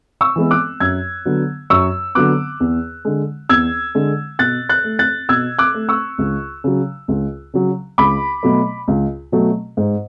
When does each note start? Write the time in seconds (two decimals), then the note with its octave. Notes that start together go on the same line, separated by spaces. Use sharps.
0.21 C#6 E6
0.36 E3 G#3 B3
0.51 D6 F#6
0.80 F#2 E6 G#6
1.25 D3 F#3 B3
1.70 F#2 C#6 E6
2.15 D3 F#3 B3 D6 F#6
2.60 E2
3.05 D3 G#3
3.49 E2 E6 G#6
3.95 D3 G#3
4.39 B2 F#6 A6
4.69 F#6 A6
4.84 A3
4.99 F#6 A6
5.29 B2 E6 G#6
5.59 D6 F#6
5.74 A3
5.89 C#6 E6
6.18 C#2
6.64 C#3 F#3
7.08 C#2
7.53 C#3 F#3
7.98 C#2 B5 D6
8.43 B2 F#3 A3
8.88 C#2
9.32 B2 F#3 A3
9.77 G#2